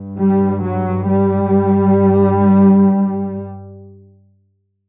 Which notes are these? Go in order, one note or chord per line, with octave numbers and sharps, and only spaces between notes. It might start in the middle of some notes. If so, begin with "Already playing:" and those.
Already playing: G2
G3
F#3
G3
G2